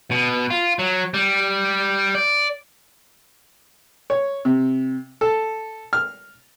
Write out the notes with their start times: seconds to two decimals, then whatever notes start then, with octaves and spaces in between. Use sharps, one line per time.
0.11 B2
0.50 F4
0.79 F#3
1.14 G3
2.15 D5
4.10 C#5
4.45 C3
5.21 A4
5.93 F6